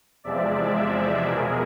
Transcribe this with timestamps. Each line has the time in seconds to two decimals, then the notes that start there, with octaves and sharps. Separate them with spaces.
0.24 E2 C3 F3 G#3 D5 E5
0.76 D5 E5
1.28 B2 G#3 G#4 A#4